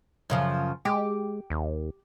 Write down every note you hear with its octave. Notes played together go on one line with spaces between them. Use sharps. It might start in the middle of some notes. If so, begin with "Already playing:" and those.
F#2 C#3 F3
G#3 G4
D#2